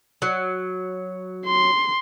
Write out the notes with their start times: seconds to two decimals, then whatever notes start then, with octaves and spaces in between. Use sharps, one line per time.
0.22 F#3
1.47 C6